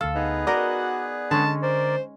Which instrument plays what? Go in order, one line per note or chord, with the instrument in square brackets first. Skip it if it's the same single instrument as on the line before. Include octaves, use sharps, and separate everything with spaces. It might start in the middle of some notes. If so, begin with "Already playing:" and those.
[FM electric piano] D2 F5 [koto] A4
[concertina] B3 G#4 B4 [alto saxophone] D#4
[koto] D#4 A#4 D#5 [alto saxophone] F#4 [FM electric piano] D5
[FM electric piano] D3 [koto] G#3 C#4 [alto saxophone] A5
[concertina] A#4 D5 [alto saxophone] C5